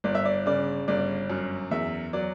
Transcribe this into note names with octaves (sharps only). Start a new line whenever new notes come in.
G1 D5
E5
D5
C#3 D5
G1 D5
F#2
E2 E5
F#3 D5